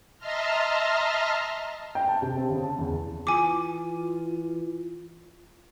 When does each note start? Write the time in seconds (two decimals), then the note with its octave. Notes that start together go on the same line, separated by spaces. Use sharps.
0.19 D#5 E5 A5 A#5 C6 F6
1.95 G5
2.08 A5
2.22 C3
2.37 C4
2.50 C#3
2.63 A5
2.78 E2
3.27 E3 F4 G#5 D6